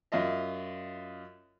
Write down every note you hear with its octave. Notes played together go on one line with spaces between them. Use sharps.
F#2 F4 D#5 E5